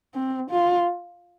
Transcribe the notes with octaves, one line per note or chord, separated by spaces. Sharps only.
C4
F4